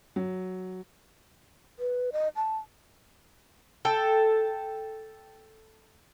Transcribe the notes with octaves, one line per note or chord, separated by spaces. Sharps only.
F#3
B4
D#5
A5
A4 G5